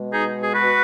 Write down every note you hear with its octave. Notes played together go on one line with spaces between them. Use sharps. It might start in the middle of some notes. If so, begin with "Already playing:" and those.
Already playing: B2 G#3
D#4 G#4
G#4
F#4 B4